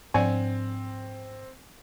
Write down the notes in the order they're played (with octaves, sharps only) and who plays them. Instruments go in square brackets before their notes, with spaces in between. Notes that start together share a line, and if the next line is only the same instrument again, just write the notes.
[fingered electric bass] G#2 D4 [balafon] F3 D5 F#5 [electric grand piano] C4 [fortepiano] G#5